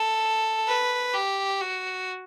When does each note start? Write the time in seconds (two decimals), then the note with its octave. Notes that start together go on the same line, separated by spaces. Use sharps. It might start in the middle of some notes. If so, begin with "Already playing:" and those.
Already playing: A4
0.67 B4
1.13 G4
1.60 F#4